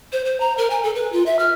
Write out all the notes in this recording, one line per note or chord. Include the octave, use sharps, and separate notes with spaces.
C5
C5
A#5
A#4
G#5
A4
B4
F4
E5
F6